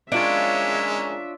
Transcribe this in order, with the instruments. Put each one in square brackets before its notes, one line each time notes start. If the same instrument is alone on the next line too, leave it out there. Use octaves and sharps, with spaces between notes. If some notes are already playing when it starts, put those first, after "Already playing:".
[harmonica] G#3 C#4 A#4 [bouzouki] D4 F4 C#5 [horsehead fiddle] E5